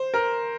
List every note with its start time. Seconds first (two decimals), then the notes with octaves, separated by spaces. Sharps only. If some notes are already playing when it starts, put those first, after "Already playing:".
Already playing: C5
0.14 A#4